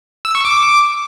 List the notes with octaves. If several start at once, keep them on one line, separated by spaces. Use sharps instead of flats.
E6
C#6
D6